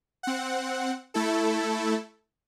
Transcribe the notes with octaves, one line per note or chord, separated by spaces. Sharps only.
C4 F#5
A3 E4 A4